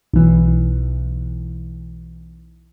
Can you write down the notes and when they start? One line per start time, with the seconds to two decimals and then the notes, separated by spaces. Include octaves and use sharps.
0.13 B1 E3